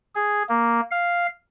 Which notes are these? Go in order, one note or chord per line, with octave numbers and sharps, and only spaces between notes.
G#4
A#3
F5